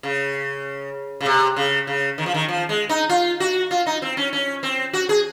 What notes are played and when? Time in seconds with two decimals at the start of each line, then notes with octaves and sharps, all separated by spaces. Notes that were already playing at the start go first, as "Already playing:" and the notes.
0.03 C#3
1.21 C#3
1.26 C3
1.56 C#3
1.87 C#3
2.18 D#3
2.26 F3
2.34 D#3
2.49 F3
2.69 G#3
2.89 D#4
3.09 F4
3.40 F#4
3.71 F4
3.86 D#4
4.02 C4
4.17 C#4
4.33 C#4
4.63 C4
4.93 F#4
5.09 G#4